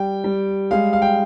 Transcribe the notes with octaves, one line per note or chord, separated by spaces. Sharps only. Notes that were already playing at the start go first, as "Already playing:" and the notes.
Already playing: G3 G5
G3
G#3 F5
F5
G5